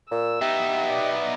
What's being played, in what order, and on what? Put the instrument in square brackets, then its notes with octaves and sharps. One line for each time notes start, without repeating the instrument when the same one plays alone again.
[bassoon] A#2 [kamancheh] E6
[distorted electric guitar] B3 D#4 [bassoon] G4 [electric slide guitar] E5
[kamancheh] D5 D#5